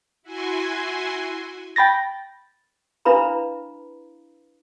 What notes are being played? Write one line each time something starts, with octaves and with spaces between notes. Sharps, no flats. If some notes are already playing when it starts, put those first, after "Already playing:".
E4 F#4 G#5 C6
G5 B5 A6 A#6
D4 E4 B4 F5 A#5 B5